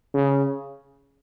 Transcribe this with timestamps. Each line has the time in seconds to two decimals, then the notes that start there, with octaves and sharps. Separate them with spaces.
0.14 C#3